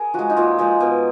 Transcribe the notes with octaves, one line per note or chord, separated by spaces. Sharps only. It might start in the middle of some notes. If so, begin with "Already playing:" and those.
Already playing: G#4 A#4
F3 G#3 F#4
D#4
A#2 F4
F3 G#3
B2